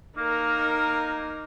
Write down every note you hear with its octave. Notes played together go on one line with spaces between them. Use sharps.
A#3 D#4 A#4